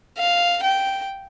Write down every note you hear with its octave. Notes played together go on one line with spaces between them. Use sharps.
F5
G5